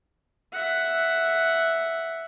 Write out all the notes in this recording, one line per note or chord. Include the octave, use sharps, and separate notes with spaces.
E5 F#5